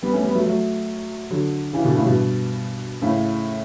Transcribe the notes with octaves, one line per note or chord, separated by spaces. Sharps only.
G3 B3
A3 C#4
G3 B3
F#3 A3
F#3 A3
D3 F#3
C#3 E3
B2 D3
A2 C#3
G2 B2
A2 C#3